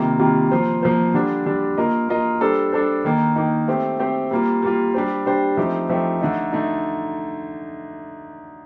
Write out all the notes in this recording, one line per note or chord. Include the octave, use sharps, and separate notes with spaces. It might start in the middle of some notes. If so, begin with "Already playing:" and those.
Already playing: C3 D#3 G3 A#3 F4
C3 D#3 G3 A#3 F4
F3 A#3 F4 C5
F3 A#3 F4 C5
D3 G3 D4
D3 G3 D4
A#3 F4 A#4 D#5
A#3 F4 A#4 D#5
G3 D4 A4 C5
G3 D4 A4 C5
D#3 A#3 D#4
D#3 A#3 D#4
A3 C4 G4 C5
A3 C4 G4 C5
G3 A#3 F4
G3 A#3 F4
G3 D4 G4 C5
G3 D4 G4 C5
F3 A3 C4 D#4 G4
F3 A3 C4 D#4 G4
D3 A3 D#4
D3 A3 D#4